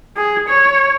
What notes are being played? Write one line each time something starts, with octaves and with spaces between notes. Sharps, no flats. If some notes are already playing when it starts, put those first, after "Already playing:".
G#4
C#5